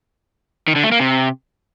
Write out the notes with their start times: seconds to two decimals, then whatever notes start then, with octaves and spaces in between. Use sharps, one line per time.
0.68 D#3
0.76 D3
0.84 A3
0.92 A#3
1.00 C3